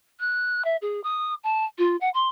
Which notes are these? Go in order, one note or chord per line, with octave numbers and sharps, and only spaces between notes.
F#6
E5
G#4
D#6
A5
F4
F#5
C6